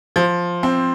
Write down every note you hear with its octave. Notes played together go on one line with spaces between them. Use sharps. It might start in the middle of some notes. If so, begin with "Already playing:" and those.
F3
C4